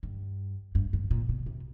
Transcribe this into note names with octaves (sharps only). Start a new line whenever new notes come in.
G2
G2
G#2
A#2
B2
C3